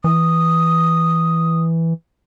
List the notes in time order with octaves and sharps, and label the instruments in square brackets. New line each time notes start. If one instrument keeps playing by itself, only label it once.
[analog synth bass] E3 [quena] D#6